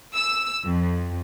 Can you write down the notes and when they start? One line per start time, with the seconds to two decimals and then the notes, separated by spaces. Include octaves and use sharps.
0.14 E6
0.67 F2